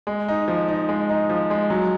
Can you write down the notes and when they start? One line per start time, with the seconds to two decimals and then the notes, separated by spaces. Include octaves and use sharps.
0.07 G#3
0.28 D#4
0.48 F3
0.68 D#4
0.89 G#3
1.09 D#4
1.29 F3
1.50 G#3
1.70 F#3